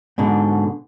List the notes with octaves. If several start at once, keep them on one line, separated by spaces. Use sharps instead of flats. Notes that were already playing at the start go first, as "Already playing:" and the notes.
G#2 B2 D3